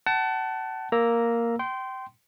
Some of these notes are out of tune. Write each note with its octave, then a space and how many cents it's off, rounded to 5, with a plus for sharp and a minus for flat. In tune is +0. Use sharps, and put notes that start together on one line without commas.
F#5 +35 A5 +0
A#3 +0 A#5 +0 E6 +0
G5 -25 C6 -10